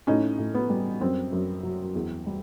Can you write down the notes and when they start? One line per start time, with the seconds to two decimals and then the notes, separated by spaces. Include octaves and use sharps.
0.07 A2 C#4 D#4
0.39 A2
0.55 B3
0.70 G3
1.01 F#2 C4
1.32 F#2
1.63 F#3
1.95 E2
2.26 G3